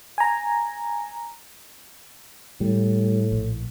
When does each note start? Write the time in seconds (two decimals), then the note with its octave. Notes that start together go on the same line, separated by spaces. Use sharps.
0.18 G#5 A#5
2.61 A2 G3
3.32 A#1